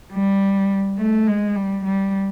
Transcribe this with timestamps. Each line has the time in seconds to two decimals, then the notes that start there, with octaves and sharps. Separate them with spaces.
0.13 G3
0.99 A3
1.27 G#3
1.56 G3
1.85 G3